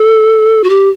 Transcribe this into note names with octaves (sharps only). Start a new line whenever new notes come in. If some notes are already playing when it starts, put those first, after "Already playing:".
Already playing: A4
F#4
G4